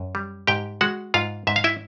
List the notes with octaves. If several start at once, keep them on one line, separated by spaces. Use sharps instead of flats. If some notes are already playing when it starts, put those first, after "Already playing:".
Already playing: F#2
G3
G#2 G4 G5
G#3 F#4 F#5
G#2 F4 F5
G#2 E5
F5
E4 E5